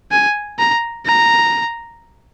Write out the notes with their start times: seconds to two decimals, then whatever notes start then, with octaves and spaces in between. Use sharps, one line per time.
0.11 G#5
0.59 A#5
1.06 A#5